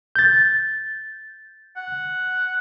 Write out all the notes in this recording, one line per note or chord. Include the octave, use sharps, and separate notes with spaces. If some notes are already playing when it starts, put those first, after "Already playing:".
G6 A6
F#5